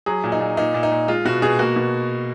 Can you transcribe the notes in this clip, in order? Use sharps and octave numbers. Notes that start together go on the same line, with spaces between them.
F#3 G#4
A#2
D#4
A#2
A#2 D#4
A#2
D#4
A#2
G#3 F4
B2 F#4
B2 G#4
A#3 F#4
B2